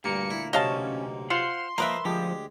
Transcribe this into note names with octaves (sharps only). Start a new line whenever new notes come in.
D2 G2 A#2 A#3 C#7
E4
B1 C3 C#4 D#5 F5 A5
F4 C5 F5 F#5 C6
F3 A#3 A#4 B4 D#5 E5
D2 F3 G#3 G4